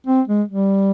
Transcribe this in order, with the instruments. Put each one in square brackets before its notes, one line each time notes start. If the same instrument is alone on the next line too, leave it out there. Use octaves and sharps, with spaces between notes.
[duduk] C4
G#3
G3